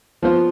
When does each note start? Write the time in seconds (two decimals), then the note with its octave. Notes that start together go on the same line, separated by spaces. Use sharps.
0.23 F3 B3 F4 C5